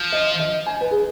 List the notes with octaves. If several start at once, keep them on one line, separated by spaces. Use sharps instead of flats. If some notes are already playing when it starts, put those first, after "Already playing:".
Already playing: F3
D#5
D#5
G#5
B4
G#4